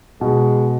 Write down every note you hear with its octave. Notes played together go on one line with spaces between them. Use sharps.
B2 G#3